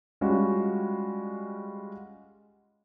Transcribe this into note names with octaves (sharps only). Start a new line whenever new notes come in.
G3 G#3 C#4 F4 F#4